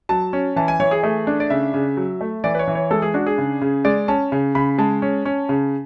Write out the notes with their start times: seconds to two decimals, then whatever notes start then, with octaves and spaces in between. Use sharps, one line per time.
0.09 F#3 A5
0.33 C#4
0.56 E3 A5
0.68 G#5
0.80 E3 C#5
0.91 G#4
1.03 A3 G#4
1.27 D4
1.40 D5
1.50 C#3 E5
1.74 C#3
1.97 F#3
2.21 A3
2.44 E3 D5
2.55 B4
2.59 C#5
2.67 E3
2.75 C#5
2.91 G#3 A4
3.02 G#4
3.14 D4 F#4
3.26 G#4
3.38 C#3
3.62 C#3
3.85 G#3 D5
4.08 C#4 A5
4.32 C#3
4.55 C#3 B5
4.78 G#3 A5
5.02 C#4
5.25 C#4
5.49 C#3